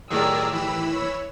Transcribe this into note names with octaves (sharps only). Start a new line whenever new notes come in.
A2 D#3 F#3 G4 G#4 A#4 D5 E6
E3 G4 B5 E6
C#5